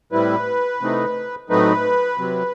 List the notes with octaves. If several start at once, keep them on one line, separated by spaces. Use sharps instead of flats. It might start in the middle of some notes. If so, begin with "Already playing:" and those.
A2 G3 C4 E4 B4
C3 E3 A3 C4 D#4
A2 F#3 A3 C4 D#4 B4
C3 F#3 C4